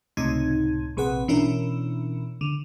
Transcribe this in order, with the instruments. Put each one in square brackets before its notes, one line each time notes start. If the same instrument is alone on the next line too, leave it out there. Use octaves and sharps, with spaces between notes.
[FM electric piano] C#2 A2 C3 D#4 G#6
A#1 C3 G#4 B4 F#5
B2 E3 C#4 D4 E4 A#4
D3